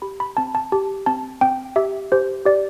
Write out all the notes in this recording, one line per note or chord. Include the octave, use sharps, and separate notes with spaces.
G4 B5
B5
C4 A5
A5
G4 A5
C4 A5
C4 G5
G4 E5
G4 C5
G4 D5